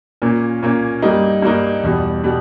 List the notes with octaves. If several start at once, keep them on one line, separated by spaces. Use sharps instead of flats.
A#2 A#3 C#4
A#2 A#3 C#4
G2 G3 A#3 D#4
G2 G3 A#3 D#4
E2 B2 G3
B2 G3